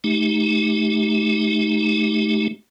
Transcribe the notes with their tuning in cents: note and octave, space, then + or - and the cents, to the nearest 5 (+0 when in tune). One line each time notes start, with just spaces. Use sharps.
A3 -30 D#4 +0 G4 -5